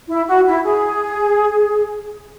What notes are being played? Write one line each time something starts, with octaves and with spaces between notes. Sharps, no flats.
E4
F#4
E4
G#4